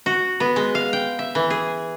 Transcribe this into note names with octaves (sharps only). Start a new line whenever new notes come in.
F#4
B3
G#3
F5
G5
E5
E3
G#4